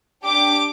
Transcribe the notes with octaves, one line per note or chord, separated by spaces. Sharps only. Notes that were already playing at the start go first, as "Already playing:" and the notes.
D4 G4 D6